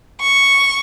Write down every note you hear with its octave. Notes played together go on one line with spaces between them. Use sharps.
C#6